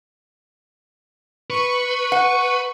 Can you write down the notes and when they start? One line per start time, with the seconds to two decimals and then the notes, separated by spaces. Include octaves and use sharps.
1.50 B4 C#6
2.12 F#5